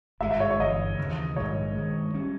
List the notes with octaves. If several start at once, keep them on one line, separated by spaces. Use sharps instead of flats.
G#1 G2 D#3 G#3 E5
E5
C#5
C#5
G1 G2 E3 D#5
D#2 C#3 E3
A#1 G#2 D#3 G3 C#5
G2 D#3 G#3
G3 C#4